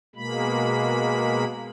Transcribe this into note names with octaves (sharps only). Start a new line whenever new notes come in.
B2 G#3 A#3 B5